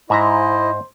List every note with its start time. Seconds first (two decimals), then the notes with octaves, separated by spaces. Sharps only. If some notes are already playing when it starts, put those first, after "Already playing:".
0.10 G#2 E4 C5 D#5 E5 A#5